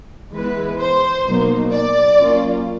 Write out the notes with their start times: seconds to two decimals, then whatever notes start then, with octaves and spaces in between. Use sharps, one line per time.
0.34 E3 G#3 B3 E4 B4
0.80 C5
1.27 B2 F#3 A#3 D#4
1.73 D5
2.18 F#3 A#3 C#4 F4